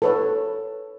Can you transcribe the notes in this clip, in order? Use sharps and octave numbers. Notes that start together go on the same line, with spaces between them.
A4 B4 C#5